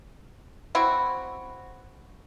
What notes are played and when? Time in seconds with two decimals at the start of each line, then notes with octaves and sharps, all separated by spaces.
0.75 C4 E4 F#4